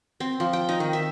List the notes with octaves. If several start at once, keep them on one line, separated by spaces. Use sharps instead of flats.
C4
F3
G5
D#4
D#3
E5